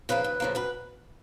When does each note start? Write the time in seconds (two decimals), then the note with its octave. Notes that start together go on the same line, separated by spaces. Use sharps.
0.09 C#3 F3 A#3 B4
0.24 D#2
0.40 C#3 F3 A#3
0.55 F#2 B4